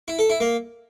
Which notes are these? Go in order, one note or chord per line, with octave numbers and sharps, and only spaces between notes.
E4
A4
E4
A#3